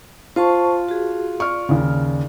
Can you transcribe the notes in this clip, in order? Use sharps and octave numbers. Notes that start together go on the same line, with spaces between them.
F4 C5 A5 C#6
F#4 G#4
D5 C#6 F6
D#2 C#3